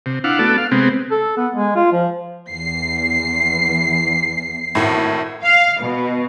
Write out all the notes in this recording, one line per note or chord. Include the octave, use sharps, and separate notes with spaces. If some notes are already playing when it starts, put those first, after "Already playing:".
C3
D4 E4 F5 F#5
A3 B3 F#4 A4 D5
F5
C3 G#3 B3 C4
A4
B3
G#3
F4
F3
E2 C7
G#1 A2
F5
B2